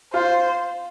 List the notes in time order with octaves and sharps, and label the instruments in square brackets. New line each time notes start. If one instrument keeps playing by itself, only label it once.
[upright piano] F4 [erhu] C5